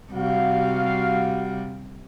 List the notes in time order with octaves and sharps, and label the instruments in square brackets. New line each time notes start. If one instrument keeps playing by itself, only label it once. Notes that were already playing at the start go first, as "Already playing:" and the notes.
[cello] C3 G3 [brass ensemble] F#4 F5